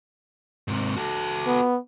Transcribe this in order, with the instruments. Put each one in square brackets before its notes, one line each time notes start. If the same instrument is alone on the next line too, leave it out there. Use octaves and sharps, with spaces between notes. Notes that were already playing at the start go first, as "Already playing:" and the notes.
[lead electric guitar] G#2 C3
F#4 A4
[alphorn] B3